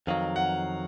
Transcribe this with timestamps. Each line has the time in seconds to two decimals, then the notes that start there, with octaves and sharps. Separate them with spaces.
0.07 F2 D#3 F#3 F5
0.36 F#5